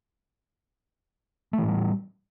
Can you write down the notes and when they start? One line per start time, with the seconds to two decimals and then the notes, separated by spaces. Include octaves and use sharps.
1.53 A3
1.58 E3
1.63 A2
1.68 G3